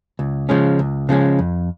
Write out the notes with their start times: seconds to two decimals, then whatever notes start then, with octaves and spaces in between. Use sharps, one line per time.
0.19 C#2
0.49 C#3 F3 G#3 C#4
0.79 C#2
1.09 C#3 F3 G#3 C#4
1.39 F2